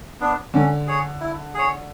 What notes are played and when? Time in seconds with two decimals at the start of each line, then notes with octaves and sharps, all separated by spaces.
0.20 B3 D4
0.54 D3 C#4
0.87 G#4 C#5
1.20 E4
1.54 G#4 C#5